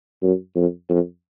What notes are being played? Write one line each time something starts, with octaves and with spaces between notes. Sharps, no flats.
F#2
F2
F2